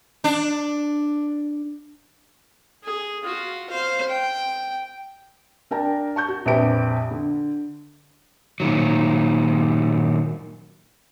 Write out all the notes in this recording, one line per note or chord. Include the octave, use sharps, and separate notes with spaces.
D4
G#4
F4 F#4
C5 F5
G5
D4 A#4 G5 A5
A5 C#6 G6
F#4
A#1 F2 G4 B4 D7
D3
A#2 D#3 F#3